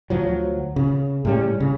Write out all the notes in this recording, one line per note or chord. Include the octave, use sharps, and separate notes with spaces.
D2 F3 F#3
C#3
A2 G3 C#4
C#3